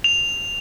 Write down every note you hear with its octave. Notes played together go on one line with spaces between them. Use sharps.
F7